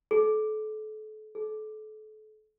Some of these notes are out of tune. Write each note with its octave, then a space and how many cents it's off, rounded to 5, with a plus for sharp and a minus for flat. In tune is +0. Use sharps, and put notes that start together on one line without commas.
A4 -35
A4 -35